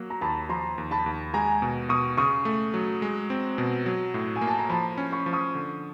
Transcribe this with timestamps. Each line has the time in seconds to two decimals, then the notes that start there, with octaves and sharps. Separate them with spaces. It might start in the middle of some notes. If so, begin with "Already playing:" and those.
Already playing: F#3 A#3
0.10 A#5
0.21 D#2 A5 B5
0.49 F3 A#5 C6
0.78 D#2
0.91 A5 B5
1.06 D#2
1.34 G#3 G#5 A#5
1.62 B2
1.89 B2 C#6 D#6
2.17 C#3 C#6 D#6
2.45 A3
2.74 F#3
3.02 G#3
3.30 C4
3.58 B2
3.86 F#3
4.14 A2
4.36 G#5
4.41 A#3
4.48 A5
4.59 A#5
4.70 F3 A5 B5
4.98 C#4
5.12 B5 C#6
5.26 F3
5.33 C#6 D#6
5.55 D3